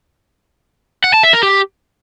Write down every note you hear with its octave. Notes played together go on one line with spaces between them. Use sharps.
F#5
A5
E5
A#4
G4